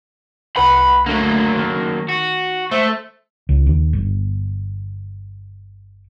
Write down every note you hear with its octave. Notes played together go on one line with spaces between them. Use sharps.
C2 B4 F#5 B5
D3 F#3 A3 A#3
D#3
F#4
A3 C5 E5
C#2
D#2
G1